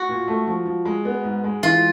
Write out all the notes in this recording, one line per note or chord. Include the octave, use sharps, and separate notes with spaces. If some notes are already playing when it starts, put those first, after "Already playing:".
Already playing: F#4
A#2
A3
F3
F3
G#3
B3
G#2
G#3
E3 F4